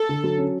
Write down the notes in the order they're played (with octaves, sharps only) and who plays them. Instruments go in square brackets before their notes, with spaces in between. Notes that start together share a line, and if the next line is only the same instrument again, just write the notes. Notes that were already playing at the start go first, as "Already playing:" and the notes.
Already playing: [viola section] A4
[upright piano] D3
F#3
C#4